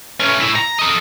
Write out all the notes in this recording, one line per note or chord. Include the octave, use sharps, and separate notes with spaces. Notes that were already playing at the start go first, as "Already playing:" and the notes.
A3 C#4
A2 E4
A#5
A4 D#5